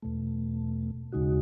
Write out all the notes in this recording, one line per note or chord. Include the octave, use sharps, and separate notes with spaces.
E2 B2 A3
D#2 C#3 G#3 D#4 F#4